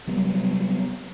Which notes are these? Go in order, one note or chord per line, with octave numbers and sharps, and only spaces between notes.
C3 F#3 G3 B3